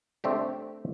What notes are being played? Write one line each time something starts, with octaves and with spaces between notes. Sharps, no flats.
A3 C4 D4 G4